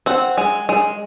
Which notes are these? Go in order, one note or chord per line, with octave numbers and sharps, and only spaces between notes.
C4 F#5
G#3
G#3